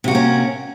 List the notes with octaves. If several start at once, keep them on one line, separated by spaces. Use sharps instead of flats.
C3 A#3 C#4 F#4